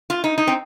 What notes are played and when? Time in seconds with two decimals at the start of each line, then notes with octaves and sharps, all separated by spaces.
0.10 F4
0.24 D#4
0.38 D#4
0.47 C4